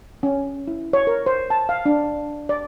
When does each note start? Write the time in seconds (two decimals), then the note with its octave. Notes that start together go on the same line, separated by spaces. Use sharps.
0.23 C#4
0.67 E4
0.93 C#5
1.07 A#4
1.26 C5
1.50 A5
1.69 F5
1.86 D4
2.49 D5